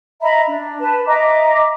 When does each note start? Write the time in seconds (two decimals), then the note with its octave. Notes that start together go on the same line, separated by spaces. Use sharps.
0.22 D#5 E5 A#5 B5
0.47 D4
0.79 B4 A5
1.06 D#5 E5 A#5 D6